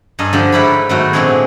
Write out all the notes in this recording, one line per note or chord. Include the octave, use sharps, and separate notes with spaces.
G2 A4 A#4 D#5 G#5
D3 F3 G4
G#2 E4 B4 C#5 B5
G#2 D#3 F#3 A3 B3 F#4
A#2 D3 G#3 A3 C4 G#4